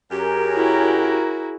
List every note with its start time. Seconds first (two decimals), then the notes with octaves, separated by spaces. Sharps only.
0.11 F#2 G4 G#4 A#4 C#5
0.55 E4 F#4